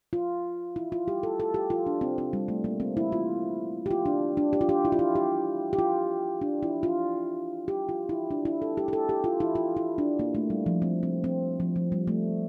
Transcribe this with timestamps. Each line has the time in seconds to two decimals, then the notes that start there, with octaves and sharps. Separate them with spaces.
0.13 F4
0.76 E4
0.92 F4
1.08 G4
1.23 A4
1.40 A4
1.54 G4
1.70 F4
1.87 D4
2.01 C4
2.18 C4
2.33 G3
2.48 A3
2.64 A#3
2.80 C4
2.97 E4
3.12 F4
3.86 G4
3.91 F4
4.06 D4
4.37 D4
4.53 G4
4.61 F4
4.69 G4
4.85 E4
4.92 F4
4.99 E4
5.16 G4
5.73 G4
5.79 F4
6.42 D4
6.63 E4
6.83 F4
7.68 G4
7.89 F4
8.09 E4
8.31 D4
8.45 E4
8.62 A4
8.77 G4
8.88 G4
8.93 A4
9.09 G4
9.24 F4
9.40 E4
9.55 F4
9.77 E4
9.98 D4
10.19 A#3
10.35 A3
10.50 G3
10.66 F3
10.82 C4
11.03 C4
11.24 C4
11.60 F3
11.76 F3
11.92 G3
12.07 A3